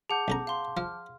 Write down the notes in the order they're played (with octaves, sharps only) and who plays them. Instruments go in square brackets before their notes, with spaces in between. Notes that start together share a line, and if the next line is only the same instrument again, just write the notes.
[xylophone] G#4 F#5 [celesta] A5 D6 G6
[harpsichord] B1 C#4 A#5
[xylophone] F5 C6
[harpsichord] F3 [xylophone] F6